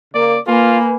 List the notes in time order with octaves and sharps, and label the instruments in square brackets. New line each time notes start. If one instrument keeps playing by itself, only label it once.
[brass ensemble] C#3 A#3 [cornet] D5
[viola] A#3 [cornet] F4 [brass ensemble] B4 G#5